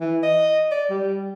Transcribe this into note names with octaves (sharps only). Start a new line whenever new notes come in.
E3
D#5
D5
G3